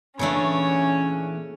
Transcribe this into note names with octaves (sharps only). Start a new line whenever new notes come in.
A#2 C#3 E3 A3 C#4 D4 C#5